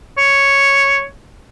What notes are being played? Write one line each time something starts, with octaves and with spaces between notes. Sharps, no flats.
C#5